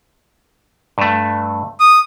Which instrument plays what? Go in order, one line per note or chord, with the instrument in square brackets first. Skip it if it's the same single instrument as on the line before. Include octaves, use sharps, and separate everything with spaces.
[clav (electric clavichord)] G2 A3
[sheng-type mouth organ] D#6